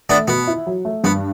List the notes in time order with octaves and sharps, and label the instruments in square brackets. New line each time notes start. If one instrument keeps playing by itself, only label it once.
[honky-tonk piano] A3 [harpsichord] B3 D4
[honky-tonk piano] B2 [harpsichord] B3
[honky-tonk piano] E4
F#3
A3
[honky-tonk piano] G2 [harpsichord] B3